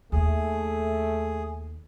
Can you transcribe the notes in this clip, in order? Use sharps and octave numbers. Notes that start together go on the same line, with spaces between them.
D#2 A3 G#4